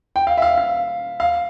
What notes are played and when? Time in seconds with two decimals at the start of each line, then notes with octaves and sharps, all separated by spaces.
0.16 G5
0.27 F5
0.37 E5
0.42 F5
0.58 F5
1.20 F5